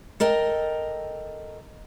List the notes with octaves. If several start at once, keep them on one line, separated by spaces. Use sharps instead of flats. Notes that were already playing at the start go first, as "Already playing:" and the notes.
A4 A#4 D#5 G5